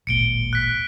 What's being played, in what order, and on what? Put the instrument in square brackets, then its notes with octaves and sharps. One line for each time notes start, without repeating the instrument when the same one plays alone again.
[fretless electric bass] D1 G#1 A#2 [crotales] C#7 D7 G7
[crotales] F#6 B6